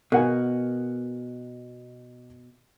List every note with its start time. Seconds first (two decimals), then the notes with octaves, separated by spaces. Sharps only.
0.12 B2 A#4 F#5 G#5